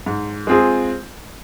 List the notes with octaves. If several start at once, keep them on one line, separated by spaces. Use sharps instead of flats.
G#2
G#3 C4 F4 G#4